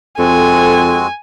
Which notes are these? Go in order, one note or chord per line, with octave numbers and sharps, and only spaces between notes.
F2 G#3 C4 F#4 A4 G#5